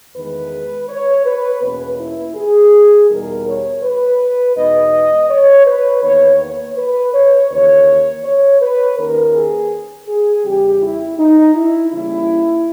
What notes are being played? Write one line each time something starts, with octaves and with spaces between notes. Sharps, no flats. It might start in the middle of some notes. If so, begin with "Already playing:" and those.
E2 D#3 G#3 B4
C#5
B4
E2 B2 A#3 C#4 B4
E4
G#4
E2 B2 G3 B3 D#4 A#4
C#5
B4
E2 B2 G#3 D#4 D#5
C#5
B4
E2 D#3 A#3 C#5
C#5
B4
C#5
D#2 C#3 E3 C#5
C#5
B4
D#2 D#3 A#3 C#4 A#4
G#4
G#4
E2 C#3 G3 G4
E4
D#4
E4
C#3 E3 G3 A#3 E4